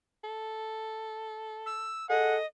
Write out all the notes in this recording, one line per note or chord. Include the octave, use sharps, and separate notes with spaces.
A4
E6
G#4 A4 D#5 F#5